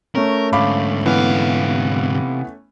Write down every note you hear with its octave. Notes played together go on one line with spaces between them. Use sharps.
A3 C#4 A#4
G#2 D3 F5 B5 D6
C3 E3 B3 F5